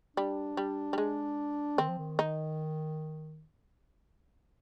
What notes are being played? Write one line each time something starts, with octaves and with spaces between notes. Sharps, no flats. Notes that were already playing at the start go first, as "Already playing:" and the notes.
G3 D4
G3
G3
G#3
D#3 C4
F3
D#3
D#4